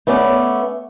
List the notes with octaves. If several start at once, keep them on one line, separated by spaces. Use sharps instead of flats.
A3 B3 C#4 D5